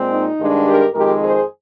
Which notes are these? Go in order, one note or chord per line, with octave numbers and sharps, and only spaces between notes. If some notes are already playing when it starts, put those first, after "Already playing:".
Already playing: A#2 G#3 C4
D#4
G2 D#3 G#3 D4
G4 A#4
F2 D#3 G#3 G4 A#4
G#4 C5